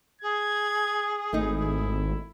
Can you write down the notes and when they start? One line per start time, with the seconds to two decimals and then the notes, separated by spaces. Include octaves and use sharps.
0.22 G#4 G#6
1.33 G#1 A3 D#4 E4